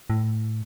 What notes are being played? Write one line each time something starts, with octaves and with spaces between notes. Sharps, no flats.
A2